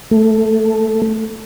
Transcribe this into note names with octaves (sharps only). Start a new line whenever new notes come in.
A3